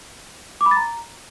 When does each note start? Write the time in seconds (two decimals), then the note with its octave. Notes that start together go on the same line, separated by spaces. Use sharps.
0.61 D6
0.66 B5
0.71 A6
0.77 A#5